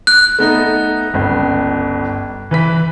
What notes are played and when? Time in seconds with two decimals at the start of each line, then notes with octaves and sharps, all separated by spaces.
0.07 F#6
0.39 A3 B3 D#4
1.14 G1 C#2
2.51 E3 B4 B6